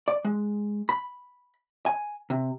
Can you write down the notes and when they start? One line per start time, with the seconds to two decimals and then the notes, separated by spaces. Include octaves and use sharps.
0.08 D5
0.25 G#3
0.89 B5
1.86 G#5
2.30 C3